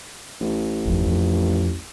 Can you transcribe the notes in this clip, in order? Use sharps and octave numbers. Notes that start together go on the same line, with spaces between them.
A1
G1 F2
F2